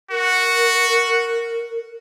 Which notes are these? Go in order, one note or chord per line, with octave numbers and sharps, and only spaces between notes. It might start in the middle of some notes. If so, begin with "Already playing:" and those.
F#4 A#4